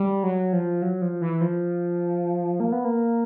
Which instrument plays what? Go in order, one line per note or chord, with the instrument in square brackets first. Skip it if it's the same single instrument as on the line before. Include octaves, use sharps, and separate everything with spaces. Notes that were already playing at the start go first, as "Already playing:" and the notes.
Already playing: [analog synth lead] G3
F#3
F3
F#3
F3
E3
F3
A#3
B3
A#3